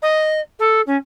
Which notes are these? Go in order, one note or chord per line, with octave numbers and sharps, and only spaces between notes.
D#5
A4
C#4